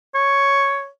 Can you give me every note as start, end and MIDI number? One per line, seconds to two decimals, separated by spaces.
0.15 0.88 73